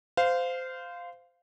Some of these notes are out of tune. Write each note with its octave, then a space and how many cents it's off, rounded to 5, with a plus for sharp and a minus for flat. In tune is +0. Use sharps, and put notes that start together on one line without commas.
C5 -20 F5 +0